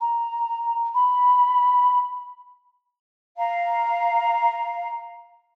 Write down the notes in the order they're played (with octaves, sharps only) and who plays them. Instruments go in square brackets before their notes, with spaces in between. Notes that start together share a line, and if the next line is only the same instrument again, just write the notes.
[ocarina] A#5
B5
[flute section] F5 A#5